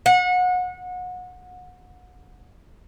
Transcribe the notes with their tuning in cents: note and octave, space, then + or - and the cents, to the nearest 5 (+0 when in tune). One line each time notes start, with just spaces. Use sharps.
F#5 -30